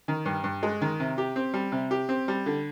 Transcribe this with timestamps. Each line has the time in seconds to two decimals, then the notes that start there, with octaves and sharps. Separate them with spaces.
0.08 D#3
0.25 G2
0.44 G2
0.63 G#3
0.81 D#3
1.00 C3
1.18 G4
1.36 C4
1.54 G3
1.72 C3
1.91 G4
2.09 C4
2.28 G3
2.46 D3